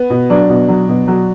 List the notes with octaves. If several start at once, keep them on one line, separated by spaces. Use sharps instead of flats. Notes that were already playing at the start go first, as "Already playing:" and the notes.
Already playing: B3
B2
F#3 D4
B2
F#3
B2
F#3